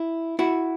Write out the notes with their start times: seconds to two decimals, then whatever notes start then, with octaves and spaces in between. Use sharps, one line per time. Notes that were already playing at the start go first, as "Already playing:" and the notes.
Already playing: E4
0.39 E4 F#4